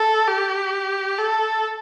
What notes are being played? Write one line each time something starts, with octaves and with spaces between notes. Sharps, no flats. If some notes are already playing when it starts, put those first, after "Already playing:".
Already playing: A4
G4
A4